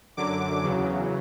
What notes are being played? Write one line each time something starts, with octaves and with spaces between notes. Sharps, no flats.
F#2 D3 F#3 D6
E2 C#3 F#3